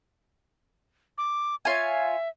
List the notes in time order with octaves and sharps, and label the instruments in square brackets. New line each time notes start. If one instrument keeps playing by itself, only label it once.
[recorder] D6
[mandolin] F4 C#5 G#5 [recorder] E5